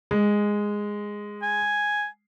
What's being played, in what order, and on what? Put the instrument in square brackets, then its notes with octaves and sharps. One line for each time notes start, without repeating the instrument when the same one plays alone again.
[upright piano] G#3
[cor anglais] G#5